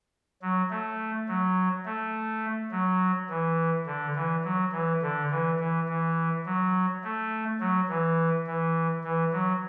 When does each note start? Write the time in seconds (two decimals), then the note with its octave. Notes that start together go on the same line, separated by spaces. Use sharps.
0.42 F#3
0.70 A3
1.28 F#3
1.85 A3
2.71 F#3
3.30 E3
3.86 D3
4.15 E3
4.44 F#3
4.73 E3
5.02 D3
5.31 E3
5.60 E3
5.89 E3
6.46 F#3
7.04 A3
7.60 F#3
7.89 E3
8.47 E3
9.04 E3
9.33 F#3